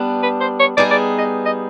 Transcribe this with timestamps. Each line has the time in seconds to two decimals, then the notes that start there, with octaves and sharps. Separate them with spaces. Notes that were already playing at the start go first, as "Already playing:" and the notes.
Already playing: G3 B3 D4
0.23 B4
0.41 C5
0.60 C#5
0.77 G3 B3 D#4 G#4 D5
0.91 D5
1.19 D#5
1.46 D#5